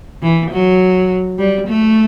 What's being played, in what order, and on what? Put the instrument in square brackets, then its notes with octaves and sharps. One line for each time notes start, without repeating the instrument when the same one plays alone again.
[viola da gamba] E3
F#3
G3
A3